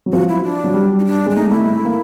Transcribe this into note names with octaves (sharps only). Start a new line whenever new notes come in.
F#3
F3 F#4
E4
D4
F#3
G3
D#4
D4
G#3 D4
A3 D#4
A3 E4
A3
A#3